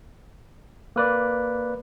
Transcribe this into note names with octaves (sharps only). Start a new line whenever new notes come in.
A#3 B4 D5